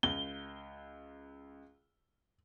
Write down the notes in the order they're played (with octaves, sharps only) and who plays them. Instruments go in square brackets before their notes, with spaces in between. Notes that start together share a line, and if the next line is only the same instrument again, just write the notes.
[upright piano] C#2 [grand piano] G7